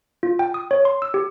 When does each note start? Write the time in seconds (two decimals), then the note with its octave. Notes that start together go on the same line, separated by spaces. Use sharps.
0.23 F4
0.39 G5
0.54 D#6
0.71 C#5
0.85 C6
1.02 E6
1.14 G4